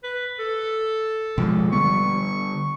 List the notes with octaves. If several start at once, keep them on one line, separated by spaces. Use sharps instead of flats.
B4
A4
B2 F3 G#3
D3 G3 B3 C#6